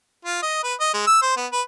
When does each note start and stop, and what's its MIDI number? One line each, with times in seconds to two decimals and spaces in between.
0.25 0.39 65
0.43 0.62 75
0.63 0.74 71
0.80 0.91 75
0.94 1.03 56
1.07 1.18 88
1.22 1.34 72
1.37 1.46 59
1.52 1.61 71